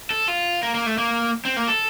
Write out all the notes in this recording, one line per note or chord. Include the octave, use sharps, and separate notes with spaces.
A4
F4
A#3
A#3
A3
A#3
C4
A#3
A4